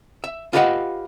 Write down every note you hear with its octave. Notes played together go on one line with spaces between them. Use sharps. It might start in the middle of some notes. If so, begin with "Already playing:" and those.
E5
F4 G4 B4 D#5 E5 F#5